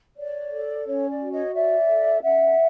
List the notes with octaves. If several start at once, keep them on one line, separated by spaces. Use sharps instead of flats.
C#5 D5
A4
C#4 C#5
D5
F#4
C#5 D#5
C#5 D5 E5
A4
C#4 E5 F#5